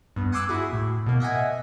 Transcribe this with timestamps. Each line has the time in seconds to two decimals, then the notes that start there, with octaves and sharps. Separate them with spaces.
0.16 G2 B3
0.32 F#5 G#5 C6 D6 E6 F#6
0.49 E4 F#4 G#4
0.73 A2
1.06 B2 A#3
1.20 D#5 E5 F#5 G#5